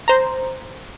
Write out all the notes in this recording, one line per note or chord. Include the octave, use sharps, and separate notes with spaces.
C5 A#5